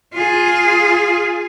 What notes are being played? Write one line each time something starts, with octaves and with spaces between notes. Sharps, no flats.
F4 G#4